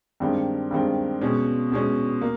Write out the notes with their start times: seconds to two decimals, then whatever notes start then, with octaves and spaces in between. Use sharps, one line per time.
0.20 G2 D#3 G#3 C4
0.71 G2 D#3 G#3 C4
1.21 B2 G#3 C#4
1.72 B2 G#3 C#4
2.22 A#3